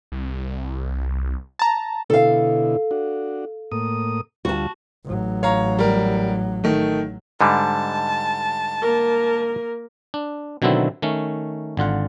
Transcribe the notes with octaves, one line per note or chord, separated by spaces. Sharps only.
C2
A5 A#5
B2 D3 E4 A4 F5
D4 F#4
A2 A#3 D#6
D2 G3 F4 F#4 A5
A1 F#3
C#5 F5 A#5
G3 A#4
D#3 A3
G#2 D3 G3 A5
A#3 A#4
D4
B2 D3 D#3 F#3 C4 E4
D#3 A3 C#4
G#1 D3 F4 F#5